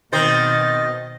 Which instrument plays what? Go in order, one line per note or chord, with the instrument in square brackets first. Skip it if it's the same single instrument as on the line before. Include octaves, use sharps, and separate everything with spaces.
[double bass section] B2 [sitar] D#3 C4 C5 [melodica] D#5 [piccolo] A6